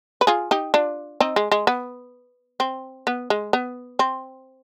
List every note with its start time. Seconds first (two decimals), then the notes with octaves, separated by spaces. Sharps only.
0.21 B4
0.27 F4 G#4
0.51 D#4 G4
0.74 D4 F4
1.20 C4 D#4
1.36 G#3
1.52 G#3
1.67 B3
2.60 C4
3.07 B3
3.30 G#3
3.53 B3
3.99 C4